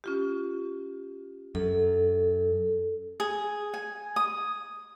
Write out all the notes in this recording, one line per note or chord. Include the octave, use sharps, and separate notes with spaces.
C#4 F4 G4
F#2 A4
G#4
G#5
D#6